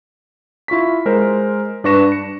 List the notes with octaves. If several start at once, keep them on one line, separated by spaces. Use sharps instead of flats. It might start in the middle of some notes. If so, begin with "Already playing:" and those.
E4 F4 C#6 B6
G#3 A#4 C5
G2 D4 B4 C#6 A#6 E7
C#7